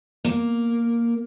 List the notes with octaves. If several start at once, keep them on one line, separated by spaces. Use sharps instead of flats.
A#3